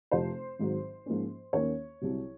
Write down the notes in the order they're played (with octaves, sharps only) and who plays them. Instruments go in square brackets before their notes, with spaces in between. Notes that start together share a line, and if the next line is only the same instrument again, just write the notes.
[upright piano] F1 F2 C3 F3 C5
G#1 G#2 F#3
G#2 F3 A#3 C#4
D#2 D#3 A#3 C#4 C#5
C2 C3 F#3